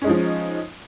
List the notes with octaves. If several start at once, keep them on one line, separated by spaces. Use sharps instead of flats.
F3 G#3 C#4 D#4